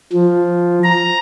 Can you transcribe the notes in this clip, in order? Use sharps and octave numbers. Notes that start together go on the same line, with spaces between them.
F3
A#5